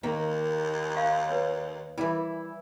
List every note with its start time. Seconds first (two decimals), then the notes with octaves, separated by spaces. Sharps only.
0.03 D#2 D#3 A#3
0.95 F5 C#6
1.29 B4 C#5
1.98 E3 G3 E4